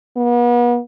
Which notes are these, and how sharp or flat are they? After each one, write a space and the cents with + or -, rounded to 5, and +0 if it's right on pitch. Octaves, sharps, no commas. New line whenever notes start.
B3 -40